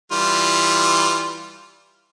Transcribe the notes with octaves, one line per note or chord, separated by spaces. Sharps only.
E3 G3 F4